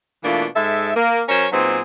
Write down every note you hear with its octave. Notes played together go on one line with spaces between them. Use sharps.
B2 E3 A3 A#3 D4 F4
G#2 G#3 A4 E5
A#3
F#3 C#4 A#4 C5 C#5
A#2 F#3 B3 C4 D#4 G#4